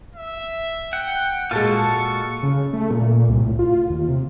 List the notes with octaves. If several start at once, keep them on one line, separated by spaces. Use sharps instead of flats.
E5
F#5 G5
A#2 G#3 F4 F#4 A4 C#6
C#3
A3
A#2
C2
A2
F4
D#2
C3